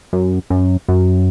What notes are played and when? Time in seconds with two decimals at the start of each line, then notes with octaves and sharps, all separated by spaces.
0.13 F#2
0.50 F#2
0.88 F#2